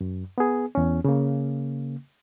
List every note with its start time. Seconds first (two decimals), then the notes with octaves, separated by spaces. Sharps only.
0.01 F#2
0.38 B3 G#4
0.75 E2 C#4
1.05 C#3 A#3